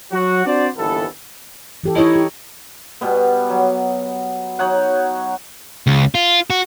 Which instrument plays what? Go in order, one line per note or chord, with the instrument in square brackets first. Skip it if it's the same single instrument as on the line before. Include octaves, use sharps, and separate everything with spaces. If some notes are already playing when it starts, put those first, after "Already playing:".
[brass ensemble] F#3 F#4
C4 D4 F#4 C5 D5
G1 D#2 E3 B3 A4
[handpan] E3 G4 A4
[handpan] D#4 C#5 D#5 [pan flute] E4
[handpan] G4
[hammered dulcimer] B2 G3 B3
F#3
F#3 D#4 C#5 F#5
[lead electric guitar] C#2
F4
F#4